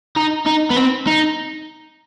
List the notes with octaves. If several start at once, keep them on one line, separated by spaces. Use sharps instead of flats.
D#4
D#4
B3
C4
D#4